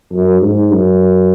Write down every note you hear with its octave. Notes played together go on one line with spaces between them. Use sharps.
F#2
G#2
F#2